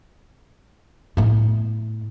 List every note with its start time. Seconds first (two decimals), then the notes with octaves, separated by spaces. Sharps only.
1.17 A2 B3